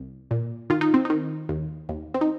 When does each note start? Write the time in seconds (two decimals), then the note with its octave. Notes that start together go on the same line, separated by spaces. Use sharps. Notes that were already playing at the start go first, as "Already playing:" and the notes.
Already playing: C2
0.31 A#2
0.70 D#3 F4
0.81 D#4
0.94 C4
1.05 D#3 D#4
1.49 D#2
1.89 D#2
2.14 C4
2.21 D#4